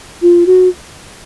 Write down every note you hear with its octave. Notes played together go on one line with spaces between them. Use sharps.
F4
F#4